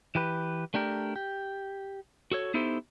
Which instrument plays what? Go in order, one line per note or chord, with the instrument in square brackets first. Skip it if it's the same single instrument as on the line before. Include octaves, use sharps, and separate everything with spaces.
[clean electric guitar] E3 G4 B4
A3 D4 G4 A#4
G4
F#4 A4 C#5
B3 D#4 E4 G4 A4 C5